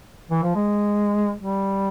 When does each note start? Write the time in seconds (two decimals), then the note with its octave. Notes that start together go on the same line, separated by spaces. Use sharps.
0.31 E3
0.43 F3
0.56 G#3
1.42 G3